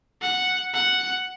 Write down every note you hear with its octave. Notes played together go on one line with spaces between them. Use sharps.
F#5
F#5